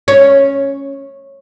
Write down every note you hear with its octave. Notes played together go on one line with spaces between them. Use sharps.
C#4